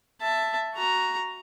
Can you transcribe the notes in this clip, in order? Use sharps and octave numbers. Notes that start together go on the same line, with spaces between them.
E5 A5
F#4 A#5